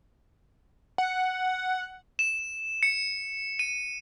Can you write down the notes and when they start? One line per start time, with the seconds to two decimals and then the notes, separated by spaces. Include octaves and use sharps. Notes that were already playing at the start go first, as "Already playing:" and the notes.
0.98 F#5
2.19 E7
2.83 C#7
3.59 D#7